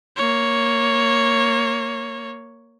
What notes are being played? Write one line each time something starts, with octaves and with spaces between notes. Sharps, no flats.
A#3 C#5